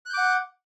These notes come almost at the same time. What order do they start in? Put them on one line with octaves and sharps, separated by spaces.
F#6 G6 D6 F#5